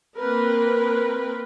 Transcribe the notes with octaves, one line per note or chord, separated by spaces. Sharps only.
A#3 C4 A#4 B4